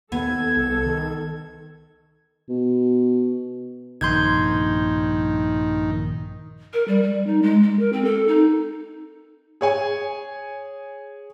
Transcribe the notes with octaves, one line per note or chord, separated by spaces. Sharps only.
D#2 B3 A4 G#6
C2
D#3
B2
A#1 G2 C3 D#3 C6 G6 G#6
A#4
G3
G3
D#4
G#3
G#3
A#4
C4
A4
D#4
G#4 C#5 G#5